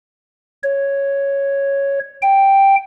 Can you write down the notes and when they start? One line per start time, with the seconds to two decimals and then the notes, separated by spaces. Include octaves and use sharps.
0.63 C#5
2.22 G5